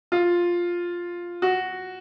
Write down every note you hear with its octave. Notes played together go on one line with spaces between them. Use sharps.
F4
F#4